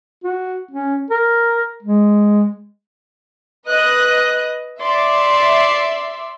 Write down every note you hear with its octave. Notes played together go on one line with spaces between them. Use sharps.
F#4
C#4
A#4
G#3
B4 D#5 F#6
D5 E5 C6